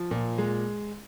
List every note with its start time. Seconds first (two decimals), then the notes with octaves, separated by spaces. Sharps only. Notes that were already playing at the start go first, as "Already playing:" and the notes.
Already playing: F3
0.11 A#2
0.38 G#3